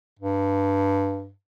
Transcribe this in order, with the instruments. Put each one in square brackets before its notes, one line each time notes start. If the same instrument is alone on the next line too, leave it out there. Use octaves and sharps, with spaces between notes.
[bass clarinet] G2